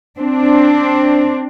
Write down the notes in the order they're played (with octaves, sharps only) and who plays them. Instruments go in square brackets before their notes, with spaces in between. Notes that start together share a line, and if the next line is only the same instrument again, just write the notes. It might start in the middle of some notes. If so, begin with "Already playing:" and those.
[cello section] C4 D4